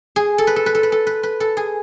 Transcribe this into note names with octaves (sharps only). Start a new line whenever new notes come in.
G#4
A4
B4
A4
B4
A4
B4
A4
B4
B4
A4
G#4